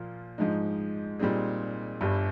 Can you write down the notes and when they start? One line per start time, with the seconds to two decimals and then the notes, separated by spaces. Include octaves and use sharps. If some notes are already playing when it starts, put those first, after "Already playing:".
Already playing: A#2 F3 A#3 F4
0.38 G#2 F3 G#3 D#4
1.19 A#2 G3 C4 D#4 G#4
2.01 G1 G2 G3